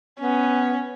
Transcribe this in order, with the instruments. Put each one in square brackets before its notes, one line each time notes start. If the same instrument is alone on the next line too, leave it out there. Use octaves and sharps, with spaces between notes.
[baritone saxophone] B3 [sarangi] C#4